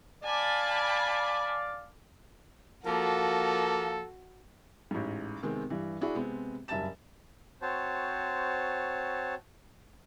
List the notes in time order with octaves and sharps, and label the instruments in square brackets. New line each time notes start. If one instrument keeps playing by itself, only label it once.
[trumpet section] D5 F5 [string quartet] G#5 A5 B5
[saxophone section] F3 A#3 [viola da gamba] F#4 [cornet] A4
[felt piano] A1 G#2
C3 D#3 G#3 B3 C4
G2 E3
D4 E4 F#4 G#4
C3 G#3 B3 C4
F#1 G2 E5 A5 A6 E7
[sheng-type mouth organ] C4 F#4 C5 C#5 A5